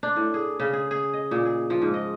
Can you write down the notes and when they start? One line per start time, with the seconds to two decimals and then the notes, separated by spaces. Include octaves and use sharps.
0.03 D4
0.16 A2
0.34 G#4
0.60 C#3
0.73 G#4
0.91 G#4
1.14 D#5
1.31 A#2
1.45 G#4
1.70 F3
1.82 G#2
1.94 D#5